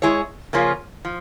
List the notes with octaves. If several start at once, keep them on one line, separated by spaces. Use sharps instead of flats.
G#3 E4 G#4 C#5
C#3 F3 A#3 C#4 F4
F3